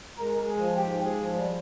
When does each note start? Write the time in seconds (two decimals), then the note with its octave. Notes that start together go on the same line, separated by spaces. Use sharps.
0.18 G#3 A#4
0.37 G#3
0.47 G#4
0.57 F3
0.76 G#2 G4
0.95 G#3
1.04 G#4
1.14 F3
1.33 G3